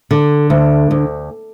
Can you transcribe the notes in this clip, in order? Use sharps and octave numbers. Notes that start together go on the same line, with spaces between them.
D3
D2
D2